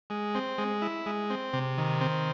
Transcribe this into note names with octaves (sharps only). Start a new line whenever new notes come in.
G#3
C4
G#3
E4
G#3
C4
C3
D#3
C4